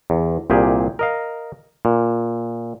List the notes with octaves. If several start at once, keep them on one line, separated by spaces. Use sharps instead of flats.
E2
C2 A#2 G4 G#4
A#4 D#5 F5
A#2